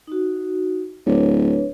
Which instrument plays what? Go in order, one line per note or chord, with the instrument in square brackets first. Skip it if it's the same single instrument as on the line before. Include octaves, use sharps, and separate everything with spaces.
[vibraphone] D#4 F#4
[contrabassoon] D1 [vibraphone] D4 B4 C#5